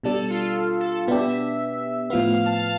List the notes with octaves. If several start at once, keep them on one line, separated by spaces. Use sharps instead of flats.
B2 G3 D4 A4
F4
A4
B2 B3 D4 G4 E5
A2 F3 B3 F5
F5
A5